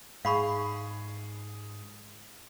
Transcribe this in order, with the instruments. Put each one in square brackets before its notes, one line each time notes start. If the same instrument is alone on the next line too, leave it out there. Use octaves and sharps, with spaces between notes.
[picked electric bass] G#2 [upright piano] G#4 [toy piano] F5 B5 C#6